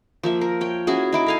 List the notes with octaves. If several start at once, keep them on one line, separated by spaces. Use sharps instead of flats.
F3 A#3 E5
A#4
C#5 G5
C#4 E4 F#4 G#4
D#4 E4 D6
A4 F5 G#5